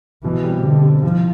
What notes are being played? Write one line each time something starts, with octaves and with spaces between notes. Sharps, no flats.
B2 E3
G3 C4
B2 D3
G3 C4
C2 F3